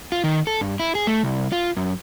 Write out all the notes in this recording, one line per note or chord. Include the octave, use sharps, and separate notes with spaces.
F4
D#3
A4
G2
E4
G#4
A3
C2
F4
F#2